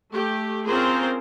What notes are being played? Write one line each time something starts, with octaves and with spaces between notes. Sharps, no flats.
A3 G4
C4 C#4 F4 G#4 A#4 C5